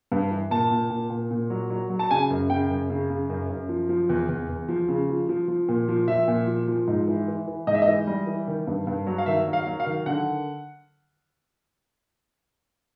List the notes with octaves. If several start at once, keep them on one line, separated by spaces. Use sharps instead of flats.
G2
E3
A#2 A5
A#2
A#2
A#2
A#2
F#3
F#3
F#3
A5
C#3 G#5
F#2
C#3 G5
F#2
C#3
C#3
F#2
F#2
F3
F3
E2
E2
E2
F3
C#3
F3
F3
F3
A#2
F3
F3 E5
A#2
F3
F3
G#2
E3
E3
E3
G#2 D#5
E5
D#5
E3
G3
E3
D#3
G2
G2
F#3
F5
D#3 E5
F#3
F5
F#3
F5
D#3
D3 F#5